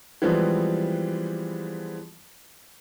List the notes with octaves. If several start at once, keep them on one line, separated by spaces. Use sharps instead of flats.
E3 F3 G3 G#3 B3 C4